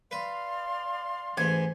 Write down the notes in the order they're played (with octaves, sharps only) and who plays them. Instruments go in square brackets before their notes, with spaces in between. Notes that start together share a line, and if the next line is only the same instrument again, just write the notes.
[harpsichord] B4 [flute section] D5 F5 C6
[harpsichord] A1 G#2 [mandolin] G#5